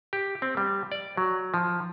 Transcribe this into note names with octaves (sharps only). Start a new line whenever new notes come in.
G4
C4
G3
D5
F#3
F3